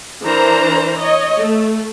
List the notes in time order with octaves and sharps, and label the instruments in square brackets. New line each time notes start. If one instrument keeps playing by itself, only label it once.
[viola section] E3 D4 A#4 C5 A#5
C#5 D#5
A3